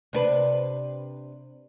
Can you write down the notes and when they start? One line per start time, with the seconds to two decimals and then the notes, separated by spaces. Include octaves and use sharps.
0.13 C3 D4 B4